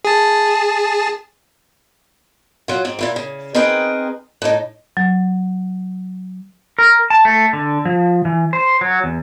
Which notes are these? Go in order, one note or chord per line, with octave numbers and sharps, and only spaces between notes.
G#4 A5
F#3 F4
G#2 C4
A#2 E4 F4
C#3
C4 D#4 G#4 A#4 B4 G5
A2 D#4
F#3
A#4
A5
A3
D3
F3
E3
C5
F#3
E2